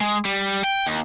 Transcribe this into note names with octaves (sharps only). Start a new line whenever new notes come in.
G#3
G3
G5
D#2